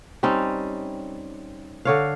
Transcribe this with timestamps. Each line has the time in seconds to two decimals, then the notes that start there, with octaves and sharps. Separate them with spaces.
0.23 G3 C4 C#4 D#4
1.85 D3 C#5 F5